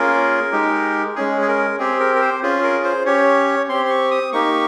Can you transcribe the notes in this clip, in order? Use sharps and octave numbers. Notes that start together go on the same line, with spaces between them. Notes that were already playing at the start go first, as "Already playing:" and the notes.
Already playing: A#3 C#4 F4 G#4 A#4
G#3 D#4 G4
G#3 C#4 G#4
G#4
A#4
C4 G4 G#4
A#4
A#4
C5
C#4 F4 G#4
A#4
C5
C#4 G4 C#5
C4 G4 C6
C6
C#6
D#6
A#3 D#4 G4 C#6